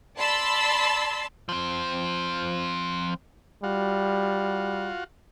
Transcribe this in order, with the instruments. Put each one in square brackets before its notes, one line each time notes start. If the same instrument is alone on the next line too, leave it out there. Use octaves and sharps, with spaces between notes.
[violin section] D5 A5 B5 C6 E6 A6
[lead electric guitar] F3 C4
[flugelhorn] G3 [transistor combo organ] F4 F#4